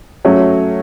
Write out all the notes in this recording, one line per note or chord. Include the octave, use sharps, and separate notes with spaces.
F#3 A3 C#4